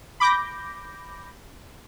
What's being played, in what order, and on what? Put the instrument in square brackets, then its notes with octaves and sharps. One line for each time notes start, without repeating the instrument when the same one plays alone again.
[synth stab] B5 D6 G6 A#6